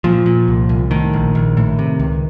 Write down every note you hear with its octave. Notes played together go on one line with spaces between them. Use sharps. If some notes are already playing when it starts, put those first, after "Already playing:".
A#2 F3
A#2
C2
C2
A2 D#3
A#1
A#1
A2
C3
C#2